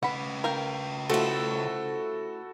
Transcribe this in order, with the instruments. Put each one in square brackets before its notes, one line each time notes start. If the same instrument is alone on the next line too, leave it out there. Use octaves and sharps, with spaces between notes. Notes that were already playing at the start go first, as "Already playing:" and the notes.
[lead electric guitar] C#3 B4 [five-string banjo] F#5 B5
[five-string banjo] A#4 F5 G5
[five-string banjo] F3 [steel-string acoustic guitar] A3 E4 [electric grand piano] F#4 A4